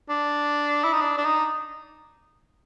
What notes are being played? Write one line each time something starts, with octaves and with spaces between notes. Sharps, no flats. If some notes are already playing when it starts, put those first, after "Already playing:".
D4
E4
D#4
D4
D4
D#4